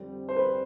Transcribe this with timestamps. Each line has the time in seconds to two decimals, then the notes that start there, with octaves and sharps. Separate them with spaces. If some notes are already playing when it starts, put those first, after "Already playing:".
Already playing: F2 D3 G3 C4
0.29 C5
0.36 B4